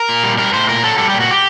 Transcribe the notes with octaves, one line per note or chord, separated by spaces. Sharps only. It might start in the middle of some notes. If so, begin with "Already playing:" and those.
Already playing: A#4
A#2
G3
G3 A#4
A2 C5
A#2 A#4
F#3 A4
G3 A4
A#2 G4
F#4
G4